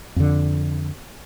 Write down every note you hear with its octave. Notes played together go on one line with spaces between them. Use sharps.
F2 D3